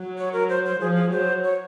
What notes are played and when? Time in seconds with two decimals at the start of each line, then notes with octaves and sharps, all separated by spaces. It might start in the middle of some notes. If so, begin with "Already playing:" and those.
Already playing: F#3
0.18 C#5
0.33 A#4
0.49 C5
0.65 C5
0.80 F3 G#4
0.96 G#4
1.12 F#3 C5
1.44 C#5